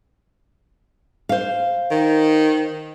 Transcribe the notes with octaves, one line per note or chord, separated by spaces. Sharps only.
C5 F5
D#3